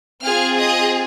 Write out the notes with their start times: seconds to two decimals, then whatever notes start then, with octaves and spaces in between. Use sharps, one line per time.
0.22 C4 F4 G#4 F5 F6
0.56 D#5 D#6